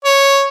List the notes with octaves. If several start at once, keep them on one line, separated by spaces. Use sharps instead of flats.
C#5